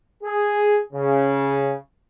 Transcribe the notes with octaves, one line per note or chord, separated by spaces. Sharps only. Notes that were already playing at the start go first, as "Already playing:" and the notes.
G#4
C#3